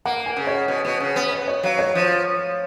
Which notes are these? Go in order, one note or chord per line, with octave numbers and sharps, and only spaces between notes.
A#3 F#5
G#5
C#3
C#5
B2
B2
C#3
B3
C#5
C#5
F#3 F5
C#5
F3